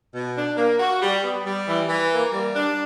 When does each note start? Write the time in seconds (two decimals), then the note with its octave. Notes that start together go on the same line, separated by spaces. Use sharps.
0.13 B2
0.36 D4
0.57 A#3
0.80 F#4
1.02 G3
1.22 B3
1.45 G3
1.66 E3
1.89 E3
2.11 A#3
2.33 G3
2.55 D4